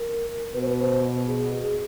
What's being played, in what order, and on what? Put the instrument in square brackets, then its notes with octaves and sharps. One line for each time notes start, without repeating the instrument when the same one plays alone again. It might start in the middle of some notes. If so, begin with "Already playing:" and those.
Already playing: [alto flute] A#4
[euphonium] B2 [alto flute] B4
[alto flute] C5
B4
C5
G#4
G#4